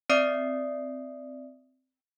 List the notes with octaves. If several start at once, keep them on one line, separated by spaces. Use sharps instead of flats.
C4 D5 E5 D#6 C7